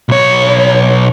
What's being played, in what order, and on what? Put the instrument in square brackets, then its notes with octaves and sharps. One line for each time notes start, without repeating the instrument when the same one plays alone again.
[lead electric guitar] B1 C#5